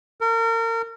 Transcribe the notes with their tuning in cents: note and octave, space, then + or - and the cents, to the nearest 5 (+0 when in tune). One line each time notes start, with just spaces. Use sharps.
A#4 -35